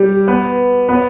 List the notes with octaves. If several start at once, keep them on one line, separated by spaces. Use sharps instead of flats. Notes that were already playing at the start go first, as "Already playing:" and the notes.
Already playing: G3 G4
B3 B4
B3 B4